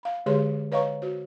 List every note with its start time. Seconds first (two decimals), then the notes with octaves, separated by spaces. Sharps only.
0.03 F5 B5
0.26 D3 G#3 G4 G#4 C#5 C6
0.72 B4 C#5 D#5 F5 A#5 C#6
1.02 F#4 C5